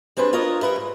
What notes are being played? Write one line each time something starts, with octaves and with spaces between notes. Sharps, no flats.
G3 C4 D4 G#4 B4
D4 F4 A#4 C#5 D#5
G3 A#4 B4 E5
G#2